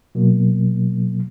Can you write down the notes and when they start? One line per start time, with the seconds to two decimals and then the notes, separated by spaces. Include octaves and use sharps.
0.15 B2 F#3 A#3